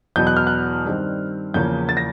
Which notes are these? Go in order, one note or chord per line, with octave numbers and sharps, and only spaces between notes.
E2 B2 F#3 B3 G6
F#6
F6
F#6
G2 D#3 G3 C4
E2 C#3 F3 A#3 C#4 G6
A6
A#6